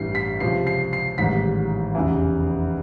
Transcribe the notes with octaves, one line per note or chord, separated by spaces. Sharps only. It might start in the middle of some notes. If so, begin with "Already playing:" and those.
Already playing: A1 G2 E3 G3 C7
B6
C#2 C3 F3 C7
C7
C7
A1 G#2 D#3 G3 B6
F1 E2 C#3 E3